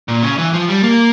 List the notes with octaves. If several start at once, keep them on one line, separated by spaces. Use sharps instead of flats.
A#2
C#3
E3
F3
G3
A#3